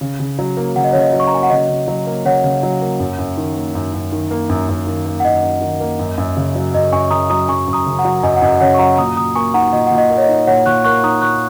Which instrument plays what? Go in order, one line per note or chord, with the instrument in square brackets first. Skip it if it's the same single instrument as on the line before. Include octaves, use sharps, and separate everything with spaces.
[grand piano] C#3
C#3
F#3
A#3
[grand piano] C#3 [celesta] F#5
[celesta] D#5
[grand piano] C#3 [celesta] C#5
[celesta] D#5
[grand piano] F#3
[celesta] C#6
A#5
[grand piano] A#3 [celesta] G#5
[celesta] F#5
[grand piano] C#3 [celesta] D#5
[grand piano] C#3
F#3
A#3
[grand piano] C#3 [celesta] C#5 F#5
[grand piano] C#3
F#3
A#3
F#2
F#2
D#3
A#3
F#2
F#2
D#3
A#3
F#2
F#2
D#3
A#3
[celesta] F#5
[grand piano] F#2 [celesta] D#5
[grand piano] F#2
D#3
A#3
F#2
F#2
C#3
F#3
[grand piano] F#2 [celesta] D#5
[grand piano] F#2 [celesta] G#5 C#6
[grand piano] C#3 [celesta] A#5 D#6
[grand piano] F#3 [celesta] A#5 D#6
[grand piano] F#2 [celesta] G#5 C#6
[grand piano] F#2
[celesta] A#5 D#6
[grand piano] C#3
[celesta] F#5 A#5
[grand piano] F#3
[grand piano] F#2 [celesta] D#5 G#5
[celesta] F#5
[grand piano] F#2 [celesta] D#5
[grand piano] C#3 [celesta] C#5 F#5
[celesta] C#6
[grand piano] F#3 [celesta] F#5 A#5
[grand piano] A#2 [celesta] A#5 D#6
[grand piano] A#2 [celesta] A#5 D#6
[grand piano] A#3 [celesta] G#5 C#6
[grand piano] D#4 [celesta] F#5 A#5
[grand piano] A#2 [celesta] D#5
[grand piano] A#2 [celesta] F#5
[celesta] D#5
[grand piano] A#3
[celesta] C#5
D#5
[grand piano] D#4
[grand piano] A#2 [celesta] C#5 F#5
[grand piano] A#2 [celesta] C#6 F#6
[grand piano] A#3 [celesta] C#6 F#6
[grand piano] D#4 [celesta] A#5 D#6
[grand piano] A#2 [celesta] C#6 F#6